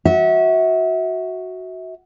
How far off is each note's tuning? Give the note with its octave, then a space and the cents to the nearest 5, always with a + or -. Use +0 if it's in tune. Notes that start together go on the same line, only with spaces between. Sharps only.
F#4 +0 E5 -30